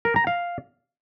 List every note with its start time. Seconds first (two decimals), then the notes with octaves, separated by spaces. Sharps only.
0.05 A#4
0.16 A#5
0.27 F5